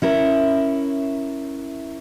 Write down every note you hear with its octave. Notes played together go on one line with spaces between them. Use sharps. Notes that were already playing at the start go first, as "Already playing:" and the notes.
C#4 E4 A#4